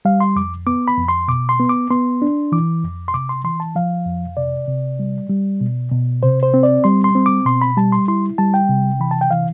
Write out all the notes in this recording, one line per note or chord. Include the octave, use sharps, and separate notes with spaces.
G3 F5
C6
F2 D6
B3 D6
B5
F2
C6
B2 D6
C6
B3
D6
B3 C6
D4
E3 D6
F2
C6
C3 D6
C6
E3 C6
A5
F3 F5
F2
C3 D5
C3
G3
G3
B2
B2
C3 C5
C5
C4
D5
G3 C6
C6
C4
D6
B2 C6
B5
G3 A5
C6
E4 C6
G3 A5
G5
C3
E3 B5
A5
G5
E3 F5